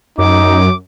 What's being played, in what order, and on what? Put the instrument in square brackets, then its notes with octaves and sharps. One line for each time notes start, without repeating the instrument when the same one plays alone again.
[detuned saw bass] F#2 [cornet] D#4 [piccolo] D6